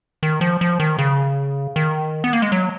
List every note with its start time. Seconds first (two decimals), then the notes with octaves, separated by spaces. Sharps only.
0.23 D#3
0.41 F3
0.61 F3
0.80 D#3
0.99 C#3
1.76 D#3
2.24 B3
2.33 A#3
2.42 G#3
2.52 F#3